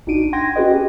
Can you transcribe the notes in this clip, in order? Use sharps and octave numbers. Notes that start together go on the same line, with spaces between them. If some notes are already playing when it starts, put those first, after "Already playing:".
A1 D4 D#4 F#4 D7 D#7
F#5 G5 C6 G#6 A#6
C#4 F#4 G#4 B4 D#5
G4